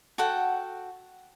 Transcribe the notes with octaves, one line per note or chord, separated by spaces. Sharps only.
F#4 A4 F#5 G5